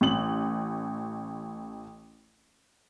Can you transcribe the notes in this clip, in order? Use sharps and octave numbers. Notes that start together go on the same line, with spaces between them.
A1 F#7